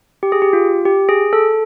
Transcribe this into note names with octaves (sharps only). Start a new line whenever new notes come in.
G4
G#4
G4
F4
G4
G#4
A4